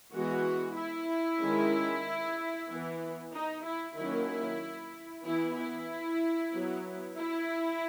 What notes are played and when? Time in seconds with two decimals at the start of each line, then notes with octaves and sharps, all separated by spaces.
0.12 E3 G#3 B3 F#4
0.76 E4
1.41 D#3 G#3 C#4
2.69 E3 B3
3.33 D#4
3.65 E4
3.97 D#3 F#3 A#3 C#4 E4
5.24 E3 B3 E4
5.56 E4
6.53 F#3 B3
7.16 E4